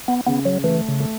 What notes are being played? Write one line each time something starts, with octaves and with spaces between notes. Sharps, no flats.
B3
C#3 B3
F#3
E3 A3
C#3
A3